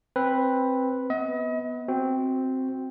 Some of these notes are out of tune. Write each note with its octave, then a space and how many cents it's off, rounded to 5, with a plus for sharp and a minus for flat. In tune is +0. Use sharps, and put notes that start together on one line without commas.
C4 +10 B4 +0
B3 +0 D#5 +40
C4 +0 F#4 +0